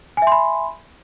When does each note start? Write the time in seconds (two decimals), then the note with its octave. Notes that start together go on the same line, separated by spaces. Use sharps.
0.17 G#5
0.22 E5
0.27 C6
0.32 B5